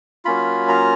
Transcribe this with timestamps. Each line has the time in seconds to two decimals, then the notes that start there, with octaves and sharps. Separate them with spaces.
0.25 F#3 A#3 C#4 F4 B5
0.68 A#5